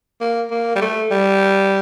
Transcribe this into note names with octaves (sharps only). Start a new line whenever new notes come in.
A#3
A#3
G3
A3
G3